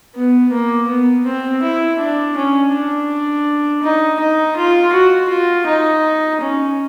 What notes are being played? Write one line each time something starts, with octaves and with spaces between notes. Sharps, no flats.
B3
A#3
B3
C4
E4
D4
C#4
D4
D#4
D#4
F4
F#4
F4
D#4
C#4